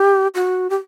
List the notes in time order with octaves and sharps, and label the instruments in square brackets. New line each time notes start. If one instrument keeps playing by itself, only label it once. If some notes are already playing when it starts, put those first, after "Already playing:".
Already playing: [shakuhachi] G4
F#4
G4